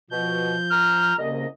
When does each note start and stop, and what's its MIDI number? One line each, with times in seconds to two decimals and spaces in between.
0.11 0.53 47
0.11 1.14 53
0.11 1.14 91
0.71 1.17 82
0.71 1.17 89
1.18 1.46 36
1.18 1.46 49
1.18 1.46 58
1.18 1.46 75